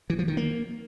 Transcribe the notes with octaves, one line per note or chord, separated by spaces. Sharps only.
E3
F3
D#3
A#3